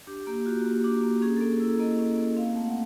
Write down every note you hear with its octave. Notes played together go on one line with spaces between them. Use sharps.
D4 G4
A#3 G4
F4 F#4
A#3 G4
D4
A#3
C#4 G#4
A#3 A4
G#4
E4
A4
A#3 D#5
C#4
A#3
C4 F5
A3
F#5